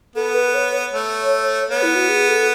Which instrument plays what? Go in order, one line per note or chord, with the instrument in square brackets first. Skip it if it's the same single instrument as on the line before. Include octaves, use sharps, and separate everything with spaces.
[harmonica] B3 [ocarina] A4
[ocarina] B4
C#5
[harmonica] A3 [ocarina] C#5
[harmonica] B3 [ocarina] C#5
[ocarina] E4
F#4
G#4
A4